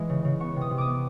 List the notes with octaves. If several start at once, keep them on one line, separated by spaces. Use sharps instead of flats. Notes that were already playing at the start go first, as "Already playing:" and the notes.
Already playing: E3 G#3
C#3
C#3
B3 C#6
C3
D#6
C3
D6 D#6
B3